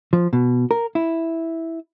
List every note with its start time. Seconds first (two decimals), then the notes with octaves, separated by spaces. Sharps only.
0.13 F3
0.33 B2
0.71 A#4
0.95 E4